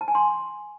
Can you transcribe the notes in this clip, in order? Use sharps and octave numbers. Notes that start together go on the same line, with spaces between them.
A5
G#5
C6